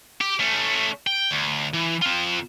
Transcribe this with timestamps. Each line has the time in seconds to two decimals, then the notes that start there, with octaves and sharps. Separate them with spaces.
0.21 G4
0.40 A3 C#4
1.07 G5
1.31 D2
1.74 E3
2.02 C4 F4